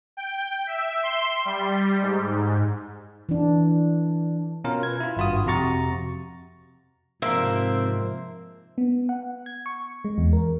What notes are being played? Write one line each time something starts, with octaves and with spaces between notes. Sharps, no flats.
G5
E5
C6
G3
G#2
E3 D4
B2 C#4 F4 A#4
B4 G#6
E4 F4
G#1 G2 F4 F#4 D#6
F2 C3 F#4 A#5 C#6 A6
G#2 C3 F3 A#3 C4 E5
B3
F#5
G#6
C#6
G#3
E2
A#4